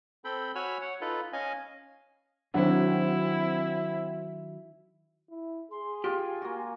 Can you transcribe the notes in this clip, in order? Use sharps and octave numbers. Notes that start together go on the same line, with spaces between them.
C4 A4 G5 B5
F#4 C#5 G#5 B5 E6 F6
C#5 F#5
D#4 F4 A4 B4
C#4 D#5 F5 G#5
D#3 F#3 C4 D4 E4 F#4
E4
G#4 C6
F4 G4 G5 G#5
A#3 F#4